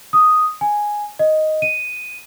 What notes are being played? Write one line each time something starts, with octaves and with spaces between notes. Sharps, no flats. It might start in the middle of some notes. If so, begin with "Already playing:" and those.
D#6
G#5
D#5
D#7